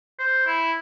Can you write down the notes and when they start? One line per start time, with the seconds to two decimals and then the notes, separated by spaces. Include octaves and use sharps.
0.19 C5
0.47 E4